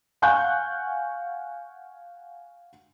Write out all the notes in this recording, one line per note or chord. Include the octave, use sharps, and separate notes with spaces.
F5 F#5 G#5 C#6 F#6 G6